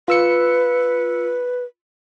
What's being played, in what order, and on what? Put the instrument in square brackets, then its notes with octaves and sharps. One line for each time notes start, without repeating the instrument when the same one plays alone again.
[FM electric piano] F4 E6 C#7 [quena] B4